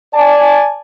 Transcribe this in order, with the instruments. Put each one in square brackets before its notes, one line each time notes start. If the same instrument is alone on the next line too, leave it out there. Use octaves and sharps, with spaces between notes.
[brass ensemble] D5 G#5 A5